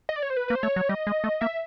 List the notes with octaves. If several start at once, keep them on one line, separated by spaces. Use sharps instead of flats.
D#5
D5
C#5
C5
B4
A#3 B4
C5
A3 C#5
F#3
G3 D#5
G#3
A3
A#3 E5